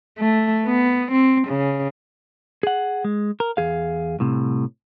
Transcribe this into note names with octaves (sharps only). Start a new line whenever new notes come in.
A3
B3
C4
C#3
G#4 F#5
G#3
A#4
E2 G#4 F5
C2 A2 C3